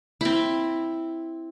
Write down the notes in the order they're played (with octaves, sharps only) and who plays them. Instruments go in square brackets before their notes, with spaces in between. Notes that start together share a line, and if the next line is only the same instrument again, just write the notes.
[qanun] C4 E4